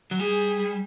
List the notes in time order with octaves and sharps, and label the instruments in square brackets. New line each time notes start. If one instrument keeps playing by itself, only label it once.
[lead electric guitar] F#3
[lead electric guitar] G3 [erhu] G#4